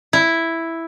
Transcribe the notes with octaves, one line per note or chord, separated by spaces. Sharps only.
E4